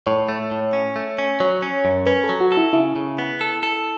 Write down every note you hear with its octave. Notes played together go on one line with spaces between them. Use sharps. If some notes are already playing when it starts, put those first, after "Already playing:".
A2 C#5
A3
A2
C#4
A3
C#4
F#3 C#5
C#4
F#2
C#4 B4
A4
F#3
F#4
A4
E4
C#3 E4
C#3
B3
A4
A4